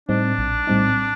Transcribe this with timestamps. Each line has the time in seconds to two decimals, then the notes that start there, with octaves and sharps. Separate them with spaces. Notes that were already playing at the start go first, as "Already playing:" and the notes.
0.09 A2 G3 C4 D4 D#4
0.38 A#1
0.67 A2 G3 C4 D#4